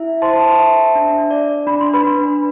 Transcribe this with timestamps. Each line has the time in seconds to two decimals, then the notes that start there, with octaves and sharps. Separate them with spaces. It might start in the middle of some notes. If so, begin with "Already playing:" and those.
Already playing: E4 E5
0.22 C5 A5 C6
0.59 E5
0.95 D4
1.31 D5
1.67 D4 B5
1.81 C6
1.94 B4 B5
2.03 D4